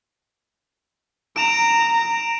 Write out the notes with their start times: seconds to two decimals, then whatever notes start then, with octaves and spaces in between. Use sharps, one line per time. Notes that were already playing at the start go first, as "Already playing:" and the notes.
1.36 A#5 D7 E7 F7